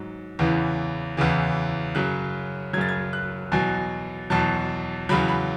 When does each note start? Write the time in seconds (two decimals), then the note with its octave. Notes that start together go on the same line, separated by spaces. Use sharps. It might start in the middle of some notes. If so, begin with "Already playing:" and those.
Already playing: G#2 F#3
0.39 E2 C#3 E3
1.17 E2 C#3 E3
1.95 F#2 C#3 F#3 F#6
2.73 F#3 G#6
2.77 F#2 C#3 A6
2.89 G#6
3.13 F#6
3.52 E2 B2 F#3 G#5
4.30 E2 B2 F#3 A5
5.09 E2 C#3 F#3 B5
5.28 B5